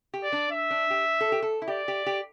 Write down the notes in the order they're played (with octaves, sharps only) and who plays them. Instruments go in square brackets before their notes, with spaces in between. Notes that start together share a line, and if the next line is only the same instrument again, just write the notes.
[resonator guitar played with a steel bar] G4
[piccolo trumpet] D5
[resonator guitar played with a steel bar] D4
[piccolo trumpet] E5
[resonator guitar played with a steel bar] D4
G4
A4
G4
A4
E4
[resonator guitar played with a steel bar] G4 [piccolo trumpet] D5
[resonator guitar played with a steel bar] G4
G4